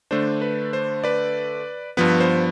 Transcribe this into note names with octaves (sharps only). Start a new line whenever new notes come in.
D3 A3 D4 C5
B4
C5
B4 D5
G2 F3 B3 B4
C5